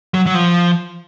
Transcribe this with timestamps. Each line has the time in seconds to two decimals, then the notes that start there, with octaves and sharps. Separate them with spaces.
0.14 F#3
0.26 F#3
0.35 F3